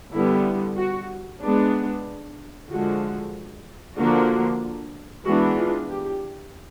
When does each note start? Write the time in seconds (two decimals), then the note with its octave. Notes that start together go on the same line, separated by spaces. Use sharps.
0.12 D3 G3 B3 E4
0.76 F#4
1.40 G#3 B3 D4
2.68 D3 F3 G#3 F#4
3.96 D3 F3 A#3 D4 F#4
5.25 E3 G#3 B3 D4 F#4
5.57 F4
5.88 G4